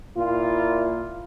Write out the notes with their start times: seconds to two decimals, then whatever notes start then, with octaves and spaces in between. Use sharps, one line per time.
0.17 A#2 E4 F4